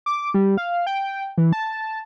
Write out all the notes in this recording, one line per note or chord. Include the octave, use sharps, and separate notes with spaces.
D6
G3
F5
G5
E3
A5